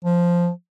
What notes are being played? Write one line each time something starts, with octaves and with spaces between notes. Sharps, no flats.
F3